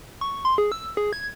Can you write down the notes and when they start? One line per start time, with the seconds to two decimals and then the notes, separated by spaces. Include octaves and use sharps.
0.21 C#6
0.45 C6
0.58 G#4
0.72 E6
0.97 G#4
1.13 G#6